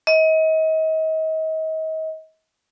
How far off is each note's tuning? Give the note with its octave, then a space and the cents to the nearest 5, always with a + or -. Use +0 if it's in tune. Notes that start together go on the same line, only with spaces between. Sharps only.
D#5 +35